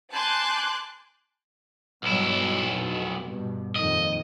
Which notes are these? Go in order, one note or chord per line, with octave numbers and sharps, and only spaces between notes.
G#5 A5 C6 D6 F#6 G6
B1 G2 B2 F#3 E4
F1 B2
G2 B2
F2 A#2 D#3 D#5